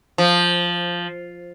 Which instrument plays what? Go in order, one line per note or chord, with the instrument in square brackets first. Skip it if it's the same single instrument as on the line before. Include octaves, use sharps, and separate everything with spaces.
[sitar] F3